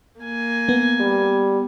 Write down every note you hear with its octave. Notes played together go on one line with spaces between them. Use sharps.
A#3 G#5
B3
G3